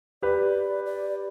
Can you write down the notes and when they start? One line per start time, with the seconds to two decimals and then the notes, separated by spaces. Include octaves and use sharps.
0.22 G4 B4 D5
0.86 D5